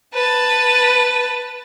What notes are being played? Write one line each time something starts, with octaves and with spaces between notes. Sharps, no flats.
B4 A5